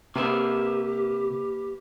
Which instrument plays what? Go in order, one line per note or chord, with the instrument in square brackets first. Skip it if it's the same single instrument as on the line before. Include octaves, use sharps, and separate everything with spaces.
[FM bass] C3 [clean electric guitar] A#3 B4 E5 [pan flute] G4